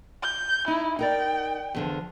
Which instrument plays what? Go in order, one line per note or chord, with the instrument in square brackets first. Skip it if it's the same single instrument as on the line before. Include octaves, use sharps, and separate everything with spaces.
[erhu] G6
[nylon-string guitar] D#4 [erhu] E4
[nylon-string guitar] D#4 A#4 D5 [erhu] G5
[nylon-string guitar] E2 D3 F3